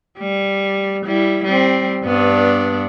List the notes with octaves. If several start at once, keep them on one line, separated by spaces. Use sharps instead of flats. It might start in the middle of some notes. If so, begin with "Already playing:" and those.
G3
G3 E4
G3 C4
G2 B3 D4